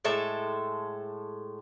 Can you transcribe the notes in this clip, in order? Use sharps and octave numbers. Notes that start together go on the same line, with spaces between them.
A2 G#3 A4 E5